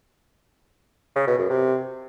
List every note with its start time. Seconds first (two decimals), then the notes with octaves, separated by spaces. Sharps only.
1.16 C#3
1.27 B2
1.39 F#2
1.50 C3